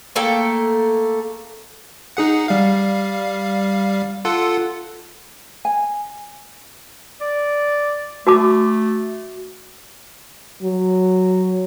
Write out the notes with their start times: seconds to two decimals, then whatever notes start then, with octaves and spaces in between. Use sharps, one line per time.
0.15 A3 A#3 A4 G5
2.17 D#4 G#4 F#5
2.48 G3 F5
4.25 F4 A4 F#5
5.65 G#5
7.21 D5
8.27 A3 F#4 A5 D6
10.62 F#3